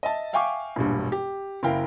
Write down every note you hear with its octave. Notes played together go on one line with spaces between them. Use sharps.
D#5 E5 A5
E5 F5 G5 G#5 C#6 D6
E1 A#1 G2
G4
F#1 E4 A#4 F5 G5